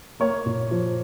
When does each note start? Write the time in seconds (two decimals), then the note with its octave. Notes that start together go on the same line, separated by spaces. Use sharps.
0.20 A#3 C#5
0.46 A#2
0.71 F3